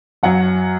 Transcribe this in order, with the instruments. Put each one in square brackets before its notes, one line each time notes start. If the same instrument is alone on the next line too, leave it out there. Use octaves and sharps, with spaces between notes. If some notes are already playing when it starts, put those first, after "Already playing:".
[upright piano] F#2 F#3 F#5